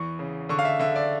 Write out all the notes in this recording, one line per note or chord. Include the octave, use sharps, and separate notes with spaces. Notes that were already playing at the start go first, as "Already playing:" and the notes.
Already playing: E2 E3 C#6
C#3
D3 C#6
F5
E5
D3 E5
D5